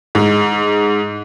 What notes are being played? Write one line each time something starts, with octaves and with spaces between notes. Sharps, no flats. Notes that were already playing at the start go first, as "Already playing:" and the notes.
G#2